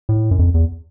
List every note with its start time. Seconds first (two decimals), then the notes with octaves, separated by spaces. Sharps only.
0.09 A2
0.31 F#2
0.39 F2
0.54 E2